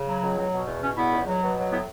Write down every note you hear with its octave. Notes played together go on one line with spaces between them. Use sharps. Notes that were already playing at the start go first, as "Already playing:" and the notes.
Already playing: C#3
F#3
C#2
F#3
B2
E2
B2 C#4
E2 B3 E4
C#2
F#3
B2
F#3
A2 B3 E4